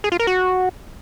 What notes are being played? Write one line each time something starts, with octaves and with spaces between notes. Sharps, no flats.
G#4
F4
A#4
F#4